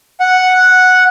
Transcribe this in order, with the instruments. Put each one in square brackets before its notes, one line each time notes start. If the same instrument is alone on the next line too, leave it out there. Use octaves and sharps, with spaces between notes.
[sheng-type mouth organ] F#5